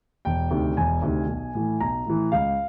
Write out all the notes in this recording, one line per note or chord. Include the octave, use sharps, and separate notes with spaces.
E1 G5
D2 C3 D#3
E1 G#5
D2 C3 D#3
B1
A2 E3
B1 A#5
A2 E3
C#2 F5